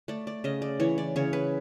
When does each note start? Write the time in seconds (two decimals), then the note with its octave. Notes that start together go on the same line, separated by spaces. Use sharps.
0.08 A3 D5
0.27 D5
0.44 C#3 D#5
0.62 D5
0.80 E3 C#5
0.98 D5
1.16 C#3 C#5
1.33 B4